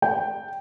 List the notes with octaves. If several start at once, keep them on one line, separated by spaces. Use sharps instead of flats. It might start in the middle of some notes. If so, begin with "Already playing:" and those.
G5